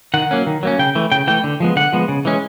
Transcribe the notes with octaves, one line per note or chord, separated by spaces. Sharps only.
D#3 F#5
F#3 A#3 C#4
D#3
F#3 A#3 C#4
C#3 G5
E3 A3
C#3 G5
E3 A3 G5
D3
F3 G#3 B3
D3 F#5
F3 G#3 B3
C#3
E3 G#3 C#4